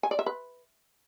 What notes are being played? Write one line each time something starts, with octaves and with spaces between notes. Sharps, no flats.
G#5
D5
E5
B4